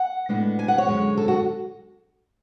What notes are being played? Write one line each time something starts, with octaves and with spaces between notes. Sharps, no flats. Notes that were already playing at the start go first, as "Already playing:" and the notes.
Already playing: F#5
A2 G#3 B3 D4
G#5
F#5
C#5
F#2 D3 G#3 D4
A4
F#4